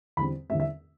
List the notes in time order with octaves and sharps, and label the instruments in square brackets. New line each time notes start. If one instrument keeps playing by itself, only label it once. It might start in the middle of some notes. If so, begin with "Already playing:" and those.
[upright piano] E2 D3 G3 C4 B5
E2 D3 G3 C4 E5
E5